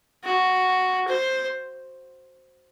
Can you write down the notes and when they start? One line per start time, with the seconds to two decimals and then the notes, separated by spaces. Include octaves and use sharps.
0.24 F#4
1.08 C5